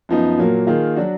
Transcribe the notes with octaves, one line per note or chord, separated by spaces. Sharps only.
F#2 F3 B3 D#4
A#2 F#3 A#3
D#3 A#3 F4 G#4
F#3 D4 F#4